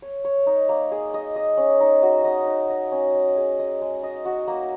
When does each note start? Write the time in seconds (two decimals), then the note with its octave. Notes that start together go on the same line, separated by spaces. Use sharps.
0.02 C#5
0.25 C#5
0.47 D#4
0.69 A#3
0.91 G#4
1.14 D#5
1.36 D#5
1.58 C#4
1.81 D#4
2.03 F#4
2.25 D#5
2.47 D#4
2.70 D#5
2.92 C#4
3.15 D#5
3.37 G#4
3.59 D#5
3.82 G#3
4.03 D#5
4.25 F#4
4.48 A#3